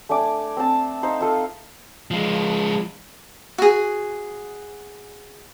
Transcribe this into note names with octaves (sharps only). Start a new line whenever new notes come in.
A3 D4 G#5 D6
C4 A5
D#4 C5 F5
F4 A4 F5
F3 G#3
F#4 G#4